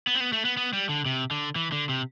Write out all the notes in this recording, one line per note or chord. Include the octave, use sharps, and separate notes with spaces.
B3
C4
B3
A3
B3
B3
G3
D3
C3
D3
E3
D3
C3